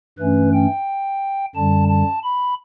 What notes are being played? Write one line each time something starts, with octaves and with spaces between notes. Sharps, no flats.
G2 E3 A3 C#4 B4
G5
F#2 D3 G3 A5
A5
B5